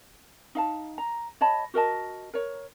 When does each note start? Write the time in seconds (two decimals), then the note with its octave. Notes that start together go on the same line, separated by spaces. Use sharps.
0.55 D#4 F5 A5
0.98 A#5
1.41 C#5 D#5 A5 B5
1.74 F#4 A#4 D#5 A5
2.34 A#4 C#5